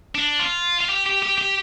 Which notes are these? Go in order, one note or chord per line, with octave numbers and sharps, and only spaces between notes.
D4
F4
F4
G4
G4
G4
G4